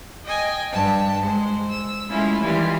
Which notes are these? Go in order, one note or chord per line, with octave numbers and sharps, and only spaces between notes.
D#5 G5 G#5
G2 G5 A5
G#3 C5
E6
G#3 A3 C#4 E4 F4
D#3 E3 G3 E4 F4